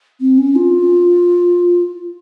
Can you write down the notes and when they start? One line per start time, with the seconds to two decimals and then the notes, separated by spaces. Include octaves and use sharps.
0.20 C4
0.38 C#4
0.55 F4